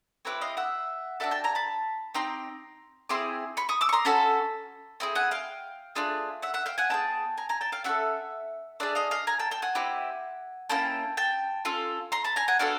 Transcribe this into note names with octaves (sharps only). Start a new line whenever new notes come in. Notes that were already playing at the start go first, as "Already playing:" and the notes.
C4 E4 G4 B4 C#5
D#5 F5
E5 F#5
D4 F#4 A4 D5 E5
G5 A5
G#5 A#5
A5 B5
C4 D#4 G4 A#5 C6
C4 E4 G#4 C6 D6
B5 C#6
C#6 D#6
D6 E6
C#6
A#5 C6
C#4 F#4 A4 A5 B5
C4 E4 G#4
F#5 G#5
F5 G5
A3 D4 F4 G#4
E5 F#5
E5 F#5
F5 G5
F#5 G#5
B3 E4 G#4 G5 A5
G#5 A#5
G#5 A#5
G5 A5
F5 G5
C#4 F#4 A4 E5 F#5
D4 F4 G#4 D5 E5
D#5 F5
D#5 F5
G#5 A#5
G5 A5
G5 A5
F#5 G#5
C4 E4 G4
A#3 C#4 E4 G5 A5
G5 A5
C#4 F4 A4
A#5 C6
A5 B5
G#5 A#5
F#5 G#5
B3 D4 F#4 A4 F5 G5